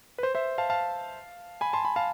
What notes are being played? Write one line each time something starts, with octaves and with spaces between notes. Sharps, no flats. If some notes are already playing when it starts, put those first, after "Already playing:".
B4
C5
C5 E5
F5 A5
F5 A5
G#5 B5
A5 C6
G#5 B5
F5 A5